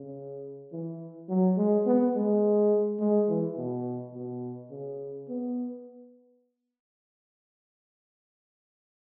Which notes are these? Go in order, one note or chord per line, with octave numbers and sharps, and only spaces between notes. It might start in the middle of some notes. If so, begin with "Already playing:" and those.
Already playing: C#3
E3
F#3
G#3
B3
G#3
G#3
E3
B2
B2
C#3
B3